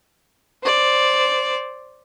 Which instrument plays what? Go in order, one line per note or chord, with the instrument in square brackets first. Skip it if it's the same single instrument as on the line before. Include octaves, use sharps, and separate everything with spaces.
[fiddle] C5 D5